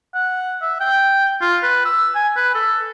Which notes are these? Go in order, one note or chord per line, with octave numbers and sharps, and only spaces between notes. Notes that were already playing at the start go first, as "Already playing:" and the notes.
F#5
E5
G5
F4
B4
E6
G#5
B4
A4